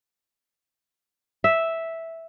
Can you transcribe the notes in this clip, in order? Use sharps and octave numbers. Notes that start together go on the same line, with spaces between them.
E5